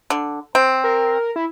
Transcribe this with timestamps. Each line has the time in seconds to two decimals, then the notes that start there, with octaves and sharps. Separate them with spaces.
0.10 D3
0.55 C4
0.84 A#4
1.36 E4